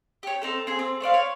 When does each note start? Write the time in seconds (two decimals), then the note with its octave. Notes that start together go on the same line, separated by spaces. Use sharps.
0.23 G4 C#5
0.42 C4 D#4 A4
0.67 C4 G#4
0.79 C4
1.01 A3 C5 D5 F5
1.14 C#5